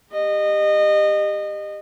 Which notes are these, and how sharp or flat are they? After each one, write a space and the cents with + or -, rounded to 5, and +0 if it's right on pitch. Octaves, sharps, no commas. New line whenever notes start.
G4 +20 D#5 -25